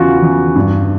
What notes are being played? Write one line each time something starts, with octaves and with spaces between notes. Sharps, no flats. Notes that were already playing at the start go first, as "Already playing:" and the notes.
Already playing: E2 C#3 E3 F4 F#4
E2
G2